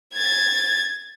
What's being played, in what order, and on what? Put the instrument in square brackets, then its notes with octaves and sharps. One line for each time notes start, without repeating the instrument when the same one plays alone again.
[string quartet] G#6 A6